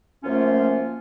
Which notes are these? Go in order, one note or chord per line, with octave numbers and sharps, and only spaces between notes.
F#2 F3 A3 A#3 C#4 F4